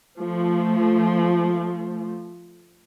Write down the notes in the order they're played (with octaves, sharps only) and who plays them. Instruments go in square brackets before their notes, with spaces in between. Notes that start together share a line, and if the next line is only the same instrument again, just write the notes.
[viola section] F3 A3